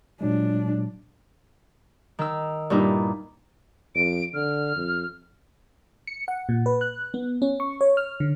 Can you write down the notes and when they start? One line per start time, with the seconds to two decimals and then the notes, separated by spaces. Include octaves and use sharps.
0.21 A#2 F#3 G#3 D4
2.19 D#3 E6
2.70 G2 A#2 D#4 E4
3.95 F2 D7
4.34 D3 F6
4.76 F2
6.07 C#7
6.28 F#5
6.49 A#2
6.66 B4
6.81 F#6
7.14 B3
7.42 C#4
7.60 C#6
7.81 C#5
7.97 F6
8.20 D3